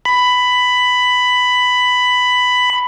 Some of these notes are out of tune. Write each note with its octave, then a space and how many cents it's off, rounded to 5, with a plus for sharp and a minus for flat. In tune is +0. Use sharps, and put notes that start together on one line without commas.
B5 +10